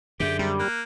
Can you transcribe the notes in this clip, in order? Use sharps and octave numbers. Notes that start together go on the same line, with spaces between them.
F#2 D3 G4 G#4 E5 G6
C3 G3
A#3 F6 F#6